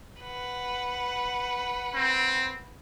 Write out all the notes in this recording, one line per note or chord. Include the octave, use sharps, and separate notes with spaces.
B4 F#5
C4